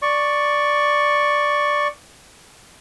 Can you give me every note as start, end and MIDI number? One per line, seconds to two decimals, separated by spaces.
0.02 1.88 74
0.02 1.88 85